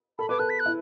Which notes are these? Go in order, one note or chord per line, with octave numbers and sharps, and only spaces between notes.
A4 B5
B4 D6
A4 F#6
B6
F#6
E4